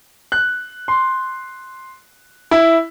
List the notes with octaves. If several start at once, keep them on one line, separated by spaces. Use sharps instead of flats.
F#6
C6
E4